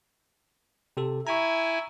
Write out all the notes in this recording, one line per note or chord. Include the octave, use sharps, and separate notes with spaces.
C3 G4 A4
E4 G#5 A#5 C#6